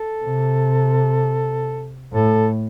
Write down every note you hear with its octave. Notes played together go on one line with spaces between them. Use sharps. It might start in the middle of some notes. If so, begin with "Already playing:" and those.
Already playing: A4
C3
A2 A4